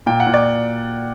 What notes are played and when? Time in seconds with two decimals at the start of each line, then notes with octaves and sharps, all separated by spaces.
0.06 A#2 G5
0.20 F#5
0.27 A#2
0.34 D5